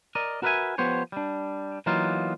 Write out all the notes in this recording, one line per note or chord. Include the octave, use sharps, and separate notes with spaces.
A#4 D5 D#5
F#4 A#4 B4 D5 E5 G#5
F3 B3 G4 C5 C#5
G3 D4
E3 F#3 A#3 B3 D#4 F4